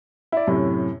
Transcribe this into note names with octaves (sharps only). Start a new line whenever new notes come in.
E4 D5
F#2 A2 C3